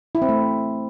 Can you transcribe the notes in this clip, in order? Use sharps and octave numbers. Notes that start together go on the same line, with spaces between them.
E4
C4
A3